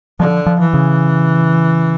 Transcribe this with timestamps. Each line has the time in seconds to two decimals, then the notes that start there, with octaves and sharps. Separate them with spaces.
0.19 D3 F3
0.46 F3
0.60 E3
0.74 C#3